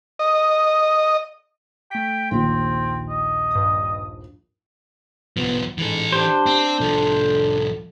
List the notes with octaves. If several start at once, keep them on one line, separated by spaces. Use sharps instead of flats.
D#5
A3 G5 B6
A#1 D#2 C4 G5
D#5
G2 D#6
C2 F3 B3
G#2 E3 A4
D4 G4 C5
C4
C2 F3 A4